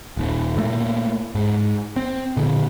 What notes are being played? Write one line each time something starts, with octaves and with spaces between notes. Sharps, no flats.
D#1 D#2
A#2 A3 A#3
G#2
C4
A#2 D3